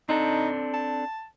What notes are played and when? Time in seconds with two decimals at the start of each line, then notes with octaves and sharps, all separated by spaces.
0.09 C4 D4 D#4 A4
0.74 A5